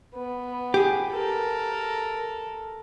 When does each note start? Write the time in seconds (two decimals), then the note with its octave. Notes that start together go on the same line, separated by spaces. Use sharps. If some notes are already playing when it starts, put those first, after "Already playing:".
0.15 B3
0.74 G4 G#4
1.12 A4 A#4